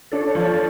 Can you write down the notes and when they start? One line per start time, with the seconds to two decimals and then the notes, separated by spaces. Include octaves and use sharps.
0.12 D4 A4 C#5
0.35 F3